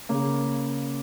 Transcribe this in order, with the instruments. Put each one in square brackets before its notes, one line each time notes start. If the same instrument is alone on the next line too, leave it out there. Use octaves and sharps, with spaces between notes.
[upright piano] C#3 A#3